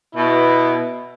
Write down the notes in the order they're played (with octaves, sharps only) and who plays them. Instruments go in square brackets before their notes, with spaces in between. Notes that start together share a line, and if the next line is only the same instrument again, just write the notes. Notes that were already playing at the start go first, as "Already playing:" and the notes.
[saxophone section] B2 [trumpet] E4